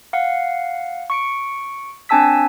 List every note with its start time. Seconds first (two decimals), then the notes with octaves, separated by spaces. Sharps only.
0.13 F5 F#5
1.10 C#6 C#7 D7
2.09 C4 D4 G#5 A5 E6 B6